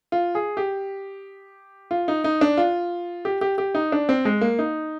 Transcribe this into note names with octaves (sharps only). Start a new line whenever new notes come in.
F4
G#4
G4
F4
D#4
D#4
D4
F4
G4
G4
G4
D#4
D4
C4
G#3
A#3
D#4